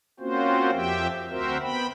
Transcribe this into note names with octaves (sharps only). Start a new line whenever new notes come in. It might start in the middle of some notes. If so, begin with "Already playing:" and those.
A#3 C4 C#4 F4 F#4 C5
F2 F3 G4 E5 G5
D2 C4 F#4 A#4 C5 E5
B3 G5 B5